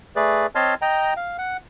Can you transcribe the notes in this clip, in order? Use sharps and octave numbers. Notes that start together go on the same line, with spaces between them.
A3 G#4 B4 D5
C4 C#5 D#5 A5 C6 F6
D#5 G5 A#5
F5
F#5